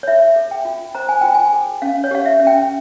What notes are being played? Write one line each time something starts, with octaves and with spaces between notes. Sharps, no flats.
C#5
F4 E5
G#4
G5
F4
C5 A#5
G#5
F4 G5
G#5
G#4
C#4 F5
C#5
G4 F5
E5
C#4
G5